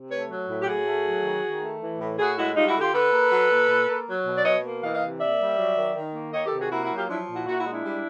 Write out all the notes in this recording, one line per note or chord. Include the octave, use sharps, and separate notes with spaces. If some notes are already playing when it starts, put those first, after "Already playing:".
Already playing: C3
A3 B4 C#5
F#3
A2
G4
A2 F#4 G#4
A3
F#3
D#3
D#3
A3
E3
A2
A2 F#4 G#4
G#3 E4 F#4
G3 D#4 F4
E4 F#4
D3
F4 G4
D3 A4 B4
A#3
F#3
A#2
A#2
A#3
F#3
B2
D5
B2 C#5 D#5
A#3
E3 D#5 F5
D#5 F5
C3
A#3 D5 E5
G3
F#3
D#3
D#3
A#3
D#3 C#5 D#5
G4 A4
C3
F#4 G#4
A#3 E4 F#4
E4 F#4
F#3
F4 G4
F3 D4 E4
A#2
E4 F#4
A#2 E4 F#4
E4 F#4
G#3
D4 E4
G3